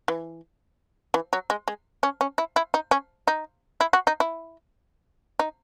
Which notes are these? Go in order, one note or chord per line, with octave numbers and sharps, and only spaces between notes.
E3
E3
F#3
G#3
G#3
C#4
C#4
E4
E4
D#4
C#4
D#4
E4
F#4
D#4
E4
D#4